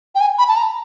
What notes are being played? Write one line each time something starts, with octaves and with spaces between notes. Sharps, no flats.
G5
G#5
B5
A5
A#5